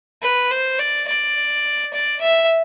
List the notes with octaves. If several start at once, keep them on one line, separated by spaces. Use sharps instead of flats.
B4
C5
D5
D5
D5
E5